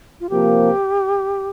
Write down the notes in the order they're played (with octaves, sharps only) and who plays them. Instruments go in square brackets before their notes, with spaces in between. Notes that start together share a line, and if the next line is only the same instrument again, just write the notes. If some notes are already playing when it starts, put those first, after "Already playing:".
[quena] F4
[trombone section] C3 F3 A#3 [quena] G4